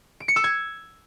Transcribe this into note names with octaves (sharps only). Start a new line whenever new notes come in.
D7
C#7
E6
G#6